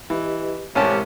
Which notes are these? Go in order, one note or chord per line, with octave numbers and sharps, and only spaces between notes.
E3 G4 B4 D#5
A1 C3 G#3 C#4 G4 A#4 A5 C#6